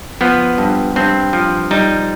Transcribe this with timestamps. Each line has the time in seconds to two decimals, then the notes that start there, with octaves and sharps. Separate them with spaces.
0.21 F3 B3
0.58 G2
0.96 G2 C4
1.33 F3
1.71 G3 D#4